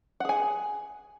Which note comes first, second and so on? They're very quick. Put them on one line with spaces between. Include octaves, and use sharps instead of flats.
F#5 G#4 G#5